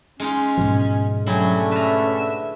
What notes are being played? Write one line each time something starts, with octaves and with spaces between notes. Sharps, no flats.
G#3 C#4 D#4 F4
G#2 B2 F3
D3 F#3 A3 C#4 E4 G4 G#4
B4 E5 A#5